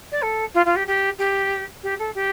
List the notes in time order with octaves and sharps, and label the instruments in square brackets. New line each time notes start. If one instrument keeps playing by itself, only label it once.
[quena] D5
A4
F4
F4
G4
G4
G4
G4
A4
G4